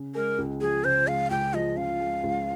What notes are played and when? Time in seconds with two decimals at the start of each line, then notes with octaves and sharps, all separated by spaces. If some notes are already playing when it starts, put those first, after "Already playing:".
Already playing: C#3
0.14 G#3 A#4
0.38 C#2
0.61 F3 G#4
0.84 C#3 C5
1.07 G#3 F5
1.30 C#2 G5
1.54 F3 D#5
1.76 C#3 F5
2.00 G#3
2.23 C#2